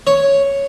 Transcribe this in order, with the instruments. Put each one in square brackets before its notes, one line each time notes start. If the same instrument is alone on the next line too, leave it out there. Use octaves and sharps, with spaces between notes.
[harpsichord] C#5